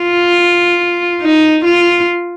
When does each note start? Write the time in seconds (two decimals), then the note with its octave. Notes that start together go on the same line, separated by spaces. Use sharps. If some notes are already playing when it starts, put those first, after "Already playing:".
Already playing: F4
1.21 D#4
1.65 F4